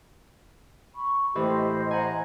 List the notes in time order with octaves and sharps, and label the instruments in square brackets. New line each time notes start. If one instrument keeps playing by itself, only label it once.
[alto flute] B5 [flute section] C#6
[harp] A2 E3 [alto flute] G4 [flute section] C5 D#5
[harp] F#5 G#5 [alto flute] A#5